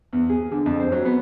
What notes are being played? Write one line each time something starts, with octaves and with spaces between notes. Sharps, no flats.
E2
G#4
D3
F2
C5
F#3
B3